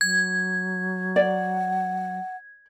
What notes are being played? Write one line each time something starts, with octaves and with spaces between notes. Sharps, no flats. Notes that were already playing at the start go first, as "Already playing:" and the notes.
F#3 G#6
D5 F#5